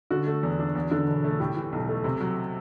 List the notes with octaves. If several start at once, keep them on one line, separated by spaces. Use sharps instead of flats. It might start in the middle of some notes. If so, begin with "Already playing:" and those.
D3 F#4
A3
E2
D4
E2
D3
E1
A3
A2 G4
E3
B1
A3
C3
F#3